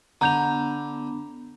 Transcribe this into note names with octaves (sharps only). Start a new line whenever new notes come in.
D3 B3 D4 A#5 G6 F7